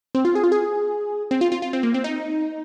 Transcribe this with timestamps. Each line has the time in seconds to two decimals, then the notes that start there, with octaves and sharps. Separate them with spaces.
0.15 C4
0.25 F4
0.35 G#4
0.44 F4
0.52 G#4
1.31 C4
1.41 F4
1.52 F4
1.62 F4
1.73 C4
1.83 A#3
1.94 C4
2.04 D#4